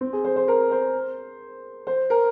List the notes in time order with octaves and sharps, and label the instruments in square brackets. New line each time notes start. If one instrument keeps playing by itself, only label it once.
[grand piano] C4
G#4
C5
C5
A#4
C5
C5
A#4